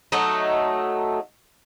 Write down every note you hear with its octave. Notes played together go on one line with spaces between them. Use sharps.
F#3 A3 D#4